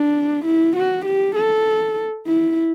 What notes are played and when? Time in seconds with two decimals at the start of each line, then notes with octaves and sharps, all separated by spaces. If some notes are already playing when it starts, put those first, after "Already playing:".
Already playing: D4
0.45 E4
0.76 F#4
1.06 G4
1.36 A4
2.27 E4